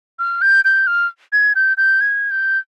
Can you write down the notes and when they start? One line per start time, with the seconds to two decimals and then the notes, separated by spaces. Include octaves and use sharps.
0.19 F6
0.42 G6
0.65 G6
0.87 F6
1.33 G#6
1.55 G6
1.77 G6
2.01 G#6
2.31 G6